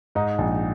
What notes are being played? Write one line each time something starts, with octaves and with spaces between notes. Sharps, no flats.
G#2 D#4
A#1